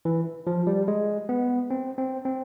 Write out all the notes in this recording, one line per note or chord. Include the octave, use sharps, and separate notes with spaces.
E3
F3
G3
G#3
B3
C4
C4
C4